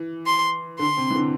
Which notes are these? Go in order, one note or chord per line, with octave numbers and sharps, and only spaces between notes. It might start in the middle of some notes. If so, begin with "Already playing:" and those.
Already playing: E3
C6
D3 C6
C3
E3
D3